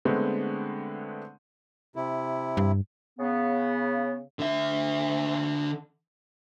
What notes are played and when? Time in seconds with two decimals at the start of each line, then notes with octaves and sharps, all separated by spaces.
0.05 D3 G#3 A3 B3 C4
1.96 C3 E4
2.57 G2
3.19 C#3 B3
4.39 D3 E5